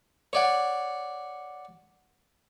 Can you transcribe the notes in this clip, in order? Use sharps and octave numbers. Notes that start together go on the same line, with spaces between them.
C#5 D5 F#5